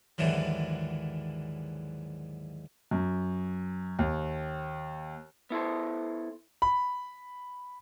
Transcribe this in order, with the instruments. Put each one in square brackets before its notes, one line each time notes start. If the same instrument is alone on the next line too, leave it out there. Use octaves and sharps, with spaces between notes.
[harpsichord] D#2 G#2 D3 E3 F#3
[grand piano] F#2
D#2
[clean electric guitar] B3 E4 A4 C5
[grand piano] B5